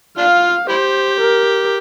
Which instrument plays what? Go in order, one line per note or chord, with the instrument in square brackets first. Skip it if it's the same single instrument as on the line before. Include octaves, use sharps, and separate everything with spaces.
[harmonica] D4 F4 [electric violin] F5
[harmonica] E4 G4 [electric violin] C5
[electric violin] A#4